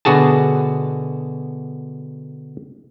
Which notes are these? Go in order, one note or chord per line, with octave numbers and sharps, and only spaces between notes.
B2 D3 F#4 G#4 A5